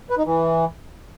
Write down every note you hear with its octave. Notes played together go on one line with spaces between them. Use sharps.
B4
D#4
E3